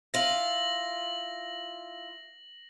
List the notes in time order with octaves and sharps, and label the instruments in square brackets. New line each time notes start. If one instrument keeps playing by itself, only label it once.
[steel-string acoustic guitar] E4 F4 [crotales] A#6 F#7